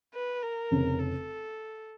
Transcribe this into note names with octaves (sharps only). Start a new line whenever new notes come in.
B4
A#4
F1 F2 C#3
A4